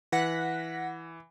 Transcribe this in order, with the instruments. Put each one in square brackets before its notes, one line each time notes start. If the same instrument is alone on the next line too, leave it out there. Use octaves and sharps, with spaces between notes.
[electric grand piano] E3 [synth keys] F#5 A#6 B6